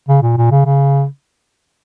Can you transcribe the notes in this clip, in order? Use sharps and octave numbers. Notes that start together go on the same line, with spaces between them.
C#3
A#2
A#2
C#3
C#3